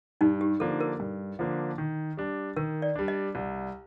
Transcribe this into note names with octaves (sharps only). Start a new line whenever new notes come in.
G2 D#4
G4
D3 F3 A#3 D4 A4
A#4
G2
D3 F3 A#3 D4
D#3
G3 D4
D#3 A#4
D5
G3 D4
D#5
C2